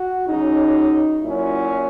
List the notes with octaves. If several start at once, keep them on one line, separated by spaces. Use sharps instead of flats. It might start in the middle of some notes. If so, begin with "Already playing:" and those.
Already playing: F#4
C#3 F#3 C#4 D#4
A#2 F#3 C#4 E4